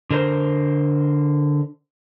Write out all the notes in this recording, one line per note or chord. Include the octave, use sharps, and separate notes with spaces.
D3 A#4 C5